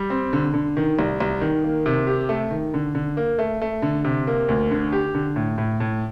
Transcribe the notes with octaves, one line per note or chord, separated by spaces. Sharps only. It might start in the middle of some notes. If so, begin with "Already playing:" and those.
Already playing: G3
C4
D3
D3
D#3
C2
C2
D#3
A#3
C3
G4
A3
D#3
D3
D3
A#3
A3
A3
D3
C3
A#3
D2
D3
G4
D3
A2
A2
A2